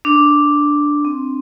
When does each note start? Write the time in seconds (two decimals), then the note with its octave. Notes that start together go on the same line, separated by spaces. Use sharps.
0.05 D4
1.05 C4